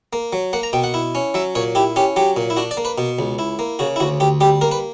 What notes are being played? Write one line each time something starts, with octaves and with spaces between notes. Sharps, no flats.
A#3
F#3
A#3 F#5
A#5
B2 G5
F#5
E4
C#4
F#3 E5
A#2 C#5
E4 G4
C#4 G4
F#3 G4
A#2
E4
D4 F#4
D5
A#3
B4
B2
C#2
E4
A#3
C#3 F#4
E4
D2 F#4
D2 G4
G3 G4
A#3 A#4
B4